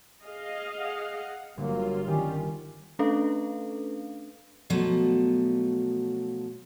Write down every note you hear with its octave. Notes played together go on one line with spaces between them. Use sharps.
G#4 D#5 F5
F#5
G1 F#3 A#3 F4
D#3 G3 C#4 G4
A3 C#4 D4 A4 B4 F5
B2 F3 F#3 A3